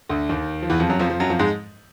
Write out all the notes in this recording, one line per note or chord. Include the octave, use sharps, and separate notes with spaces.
D2 D3
D#2 D#3
F3
E2 E3
F2 F3
F#2 F#3
F2 F3
F2 F3
F#2 F#3
F2 F3
G#2 G#3